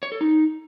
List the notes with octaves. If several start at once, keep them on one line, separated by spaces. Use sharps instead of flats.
C#5
A4
D#4